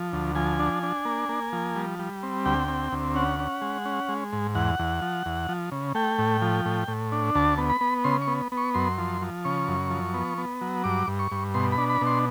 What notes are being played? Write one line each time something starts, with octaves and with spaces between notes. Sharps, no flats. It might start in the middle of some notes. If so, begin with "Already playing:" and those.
Already playing: F3
D2
F3 G#5
D4
D4
A#3
A#3
F3
G3
G3
C4
D2 G5
C4
D2
C#4 F#5
C#4
G#3
C#4
G#3
G#2
E2 F#5
E2
F3
E2
F3
C#3
A3 G5
A2
F3
A2
A2
D4
D2 A5
B3
B5
B3
C#3 C6
C#6
B3
B3
C#6
F#2 C6
F3
F3
C#3 C#6
F#2
F3
B3
B3
F#3
G2 D6
G2
C#6
G2
B2 C6
B5
D4
B5
B2
C6